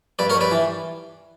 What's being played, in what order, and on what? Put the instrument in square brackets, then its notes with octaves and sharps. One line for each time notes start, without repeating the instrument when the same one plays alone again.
[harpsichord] G2 B4 D5
A#4 C#5
G2
B4 D5
E3